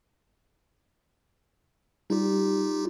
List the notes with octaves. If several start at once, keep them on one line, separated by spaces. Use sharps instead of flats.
G3 D#4 F4 G4